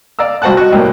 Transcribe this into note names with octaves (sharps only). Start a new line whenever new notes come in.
D5 F5 A#5 E6
C2 F#4 C5 F#5 A5 F#6
F#4 D#5
C2 A2 A#3